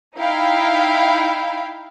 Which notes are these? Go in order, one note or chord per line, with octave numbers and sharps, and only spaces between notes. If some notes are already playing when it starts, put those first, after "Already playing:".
D#4 E4 F5 G5